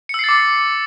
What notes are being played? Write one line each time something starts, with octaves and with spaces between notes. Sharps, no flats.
D6 E6 A6 C7 C#7